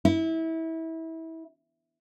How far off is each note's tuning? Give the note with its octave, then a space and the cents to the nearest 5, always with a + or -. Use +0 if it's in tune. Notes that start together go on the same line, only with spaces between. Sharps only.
E4 -25